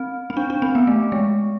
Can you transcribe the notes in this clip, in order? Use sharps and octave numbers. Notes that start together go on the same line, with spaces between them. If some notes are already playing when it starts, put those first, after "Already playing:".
Already playing: C4
C4
D4
D4
C4
B3
A3
G#3